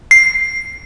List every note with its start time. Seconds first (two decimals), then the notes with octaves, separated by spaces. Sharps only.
0.11 C7